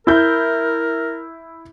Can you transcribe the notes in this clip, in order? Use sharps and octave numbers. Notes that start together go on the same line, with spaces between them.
E4 A#4 G6